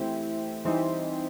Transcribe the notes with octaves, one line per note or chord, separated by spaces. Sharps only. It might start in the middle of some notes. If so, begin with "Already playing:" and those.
Already playing: E3 A3 C4 E4 G4
E3 G3 C4 D#4 G4